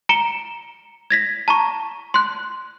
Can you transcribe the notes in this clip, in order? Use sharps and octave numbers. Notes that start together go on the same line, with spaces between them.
A#5 C#7 D7 E7 G7
G#6 A#6 B6
A5 A#5 C#6
C6 F#6